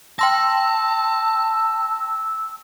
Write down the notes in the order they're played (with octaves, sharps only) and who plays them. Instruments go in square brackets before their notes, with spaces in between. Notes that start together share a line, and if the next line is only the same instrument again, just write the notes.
[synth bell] G5 C6 A#6 [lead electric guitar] A5 [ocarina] E6